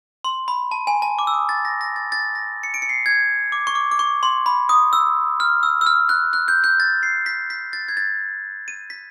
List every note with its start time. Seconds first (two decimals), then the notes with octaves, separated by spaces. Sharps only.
0.24 C6
0.48 B5
0.71 A5
0.87 G#5
1.02 A5
1.19 D6
1.27 E6
1.34 D#6
1.49 A6
1.65 A#6
1.81 A#6
1.96 A6
2.12 A6
2.35 A#6
2.63 C#7
2.74 D7
2.82 C#7
2.89 C7
3.06 G#6
3.52 D6
3.67 C#6
3.75 D6
3.91 D6
3.99 C#6
4.23 C6
4.46 B5
4.69 D#6
4.93 E6
5.40 F6
5.63 E6
5.81 E6
5.86 F6
6.09 F#6
6.33 F#6
6.48 G6
6.64 G6
6.80 A6
7.03 C7
7.26 B6
7.50 B6
7.73 A6
7.88 G#6
7.97 A6
8.68 D#7
8.90 B6